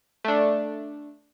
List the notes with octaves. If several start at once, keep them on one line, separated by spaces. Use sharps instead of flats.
A3 D4